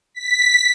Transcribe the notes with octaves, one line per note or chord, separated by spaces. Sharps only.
B6